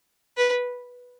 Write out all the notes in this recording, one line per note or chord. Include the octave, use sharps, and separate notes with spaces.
B4